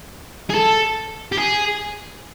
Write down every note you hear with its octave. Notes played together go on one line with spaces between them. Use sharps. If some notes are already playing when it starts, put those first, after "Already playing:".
G#4
A4
G4
G#4